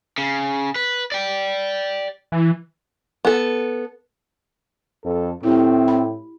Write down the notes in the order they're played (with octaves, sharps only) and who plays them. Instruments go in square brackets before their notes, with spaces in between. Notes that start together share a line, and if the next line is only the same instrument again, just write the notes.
[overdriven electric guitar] C#3
B4
D5 G5
[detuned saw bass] E3
[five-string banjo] B3 A4
[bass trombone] F2 [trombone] A4
[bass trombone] A2 [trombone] A3 [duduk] C4 [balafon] E4 G4
[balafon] B5